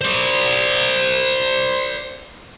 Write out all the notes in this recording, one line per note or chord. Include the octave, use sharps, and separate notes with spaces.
C5 D5